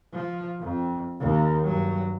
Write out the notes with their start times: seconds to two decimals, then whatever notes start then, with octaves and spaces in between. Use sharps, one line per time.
0.13 F3
0.60 F2
1.20 D#2
1.64 G2 F#3